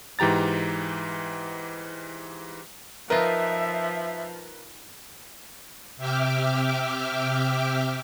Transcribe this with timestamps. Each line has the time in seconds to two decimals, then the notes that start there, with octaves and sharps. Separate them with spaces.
0.19 G#2 E3 G4 A#5 A6
3.10 F3 D#4 F4 A#4 B4 E5
5.97 C3 E5 G5 D6 F6